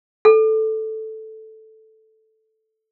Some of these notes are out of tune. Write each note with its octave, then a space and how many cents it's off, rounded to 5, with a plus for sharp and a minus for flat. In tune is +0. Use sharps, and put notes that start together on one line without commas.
A4 -5